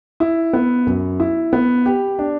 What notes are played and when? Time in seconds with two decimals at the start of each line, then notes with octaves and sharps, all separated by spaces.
0.20 E4
0.53 B3
0.86 F#2
1.20 E4
1.53 B3
1.86 G4
2.19 D4